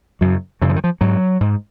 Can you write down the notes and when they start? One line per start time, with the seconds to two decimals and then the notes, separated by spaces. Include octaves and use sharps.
0.21 F#2 C#3 F#3
0.62 F#2 C#3 F#3
0.69 F3
0.76 D#3
0.84 F3
1.01 G#2 F#3
1.41 G#2